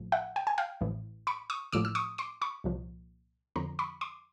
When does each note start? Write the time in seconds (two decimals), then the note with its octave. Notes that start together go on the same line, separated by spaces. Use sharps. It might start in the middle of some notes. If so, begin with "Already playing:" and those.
Already playing: A1 A2 F3
0.12 E5 F#5
0.36 G5
0.47 G#5
0.58 F5 G5
0.81 A1 A2 E3
1.27 B5 C#6
1.50 C#6 D#6
1.72 A1 A2 F3 D6 E6
1.85 E6
1.95 C#6 D#6
2.18 C6 D6
2.41 B5 C#6
2.64 C2 A#2 F3
3.56 F2 D3 F3 A#5 C6
3.79 B5 C#6
4.01 C6 D6